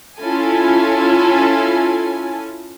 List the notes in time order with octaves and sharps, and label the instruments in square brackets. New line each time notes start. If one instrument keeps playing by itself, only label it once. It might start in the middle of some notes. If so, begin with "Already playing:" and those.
[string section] C#4 E4 F4 A4 G#5